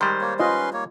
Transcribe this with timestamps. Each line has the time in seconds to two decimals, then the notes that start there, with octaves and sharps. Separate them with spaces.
0.01 D#3 G3 G#3 C5
0.21 A#3 C#5
0.40 C#4 F4 B4 D#5 C6
0.73 A#3 C#5